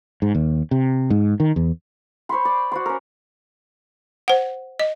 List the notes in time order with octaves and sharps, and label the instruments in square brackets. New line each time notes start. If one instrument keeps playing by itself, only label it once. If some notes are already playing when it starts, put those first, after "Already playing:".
[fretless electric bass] G#2
D#2
C3
G#2
D#3
E2
[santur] C5 C#5 B5 C6
D5
F#4 C5 C6
C#4 A#4
[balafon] C5 F#5
D#5